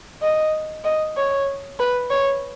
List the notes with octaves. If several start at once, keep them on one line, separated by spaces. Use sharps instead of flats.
D#5
D#5
C#5
B4
C#5